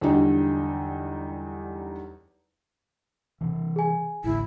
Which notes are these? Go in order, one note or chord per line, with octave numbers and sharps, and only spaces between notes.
E2 D3 F#3 G3 D4 D#4
C3 E3
G#4 G#5
A1 D2 E4